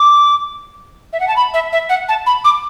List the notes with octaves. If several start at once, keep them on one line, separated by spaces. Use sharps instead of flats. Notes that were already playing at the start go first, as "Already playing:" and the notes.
Already playing: D6
E5
F#5
A5
B5
E5
E5
F#5
A5
B5
D6